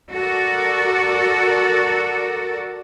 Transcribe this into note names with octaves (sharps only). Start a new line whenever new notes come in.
F#4 A4 A#4 D5